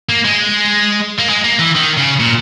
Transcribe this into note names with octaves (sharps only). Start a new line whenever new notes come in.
A#3
G#3
A#3
G#3
A#3
E3
D#3
C#3
A#2